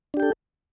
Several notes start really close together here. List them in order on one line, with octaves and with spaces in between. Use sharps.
D4 G4 G5 A4